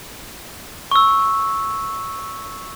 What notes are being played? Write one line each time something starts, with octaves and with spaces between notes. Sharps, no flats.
C#6 E6